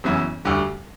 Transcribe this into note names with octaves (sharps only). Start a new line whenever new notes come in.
F#1 F#2 E3 B3 E4
D2 D3 G3